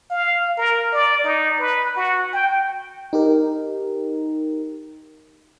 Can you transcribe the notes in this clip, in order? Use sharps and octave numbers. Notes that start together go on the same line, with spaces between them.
F5
A#4
D5
D#4
B4
F#4
G5
D#4 G4 A#4